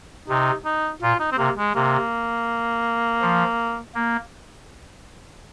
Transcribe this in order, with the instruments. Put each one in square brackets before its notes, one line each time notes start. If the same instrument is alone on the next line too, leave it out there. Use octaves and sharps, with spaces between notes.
[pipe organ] C3 [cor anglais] D#4
[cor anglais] D#4
[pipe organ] A#2 [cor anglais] F4
[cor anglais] D#4
C4
[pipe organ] C3 [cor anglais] A#3
[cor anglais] G#3
[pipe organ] C3 [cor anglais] A#3
[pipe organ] F3
A#3